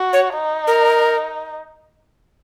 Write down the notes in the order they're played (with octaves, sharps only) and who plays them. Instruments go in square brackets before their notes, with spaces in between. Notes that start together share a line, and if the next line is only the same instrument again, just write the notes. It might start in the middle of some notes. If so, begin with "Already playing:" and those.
Already playing: [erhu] F#4
[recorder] C#5
[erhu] D#4
[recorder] A#4